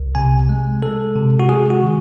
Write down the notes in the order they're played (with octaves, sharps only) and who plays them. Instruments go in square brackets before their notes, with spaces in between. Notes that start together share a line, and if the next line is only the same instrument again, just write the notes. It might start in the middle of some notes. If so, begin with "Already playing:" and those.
Already playing: [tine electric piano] C2
C3 G#5
G#3
G#3 A4
C3
F#4
G#3 G#4
F#4
D#3